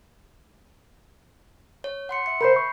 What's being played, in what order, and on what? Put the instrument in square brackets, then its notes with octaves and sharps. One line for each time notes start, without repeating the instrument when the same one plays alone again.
[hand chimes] C#5
F#5 C6 C#7
E5 C#7
[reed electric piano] A#4 C5 [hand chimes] B5 G6 C7
[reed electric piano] C#6